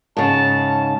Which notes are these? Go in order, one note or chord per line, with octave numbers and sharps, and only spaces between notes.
G#2 C#3 A5